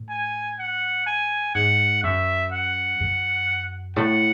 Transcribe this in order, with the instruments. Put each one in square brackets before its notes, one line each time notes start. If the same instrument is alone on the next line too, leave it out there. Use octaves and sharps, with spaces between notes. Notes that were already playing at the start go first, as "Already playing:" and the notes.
Already playing: [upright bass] A2
[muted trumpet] G#5
F#5
G#5
[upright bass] G#2 [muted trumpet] F#5
[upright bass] F#2 [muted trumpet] E5
[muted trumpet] F#5
[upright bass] F#2
[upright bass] A2 [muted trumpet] F#5